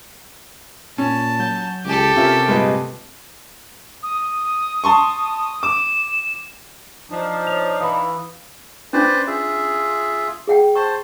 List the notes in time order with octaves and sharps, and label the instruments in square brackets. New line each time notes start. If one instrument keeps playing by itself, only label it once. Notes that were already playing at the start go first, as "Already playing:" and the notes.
[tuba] A#2 [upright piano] C#4 [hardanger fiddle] A5
[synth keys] F#3 G6
[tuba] C#2 [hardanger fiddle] G4 A4
[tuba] C3 [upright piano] C#4 A#4 [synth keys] F4 E5
[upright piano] G2 A#2 G#3 [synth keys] A3 B4 D#5
[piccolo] D#6
[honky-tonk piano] A5 C6 C#6
[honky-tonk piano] D6 [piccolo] E7
[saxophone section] F3 [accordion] D4 D#4
[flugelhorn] C#5 [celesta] F7
[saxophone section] E3 [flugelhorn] F5 [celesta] B5 D#6
[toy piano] C#4 D4 [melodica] B4 C5 D5
[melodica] F4 G#4 E5
[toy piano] G#4 F#5 G5
[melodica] C5 A5 [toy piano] C#6